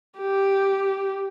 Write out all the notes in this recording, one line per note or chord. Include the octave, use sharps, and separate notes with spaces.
G4